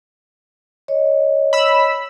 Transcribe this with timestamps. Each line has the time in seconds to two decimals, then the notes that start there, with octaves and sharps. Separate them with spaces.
0.88 C#5 D#5
1.53 B5 E6